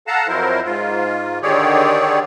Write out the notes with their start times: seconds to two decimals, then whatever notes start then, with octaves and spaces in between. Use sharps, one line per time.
0.07 A4 F5 F#5 A5 A#5
0.28 F2 F#3 E4 A#4 C5
0.64 G#2 F4
1.42 D3 D#3 G4 G#4 C#5 D5